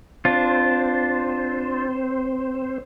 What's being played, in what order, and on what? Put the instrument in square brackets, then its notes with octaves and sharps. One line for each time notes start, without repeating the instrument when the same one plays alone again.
[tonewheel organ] C4 C5 [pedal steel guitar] D4 F4